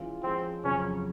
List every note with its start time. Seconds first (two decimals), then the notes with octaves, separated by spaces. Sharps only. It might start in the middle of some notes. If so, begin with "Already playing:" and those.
Already playing: E3 G#3 C#4 F4
0.23 F3 G#3 C4 C#4
0.64 F2 C#3 F#3 C#4